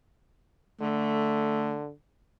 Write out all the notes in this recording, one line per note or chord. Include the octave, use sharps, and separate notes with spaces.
D3 A3